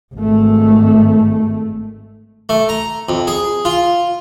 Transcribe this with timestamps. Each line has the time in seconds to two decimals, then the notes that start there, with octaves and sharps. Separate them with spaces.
0.15 G#1 A3
2.49 A3
2.69 A#5
3.09 F2
3.27 G#4
3.65 F4